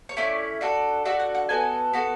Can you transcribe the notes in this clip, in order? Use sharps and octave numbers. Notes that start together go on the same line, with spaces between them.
C#5
A3 C#4 E4 D5
D4 F#4 A4
D4 F#4 A4 E5
F#5
F#5
B3 F#4 A4 G#5
B3 F#4 A4